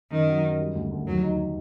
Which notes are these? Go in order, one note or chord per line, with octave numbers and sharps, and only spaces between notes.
F#2 D#3
F#3
F#2
G3
D2
D2
D#2 F#3
D#4